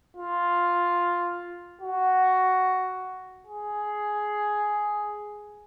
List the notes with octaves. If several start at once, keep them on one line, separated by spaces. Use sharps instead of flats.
F4
F#4
G#4